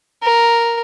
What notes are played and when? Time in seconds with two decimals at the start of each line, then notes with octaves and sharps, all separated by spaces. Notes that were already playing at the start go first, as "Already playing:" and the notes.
0.23 A#4